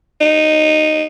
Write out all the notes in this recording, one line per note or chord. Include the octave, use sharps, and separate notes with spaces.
D#4